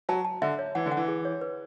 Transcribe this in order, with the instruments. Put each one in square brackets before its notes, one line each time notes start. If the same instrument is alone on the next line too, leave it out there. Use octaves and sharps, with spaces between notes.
[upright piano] F#3 [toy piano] A5
[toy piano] A5
[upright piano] D3 [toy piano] E5
[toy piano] C#5
[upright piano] E3 [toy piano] F#5
[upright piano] D3
[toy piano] F#5
[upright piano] E3
[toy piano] G#4
C#5
B4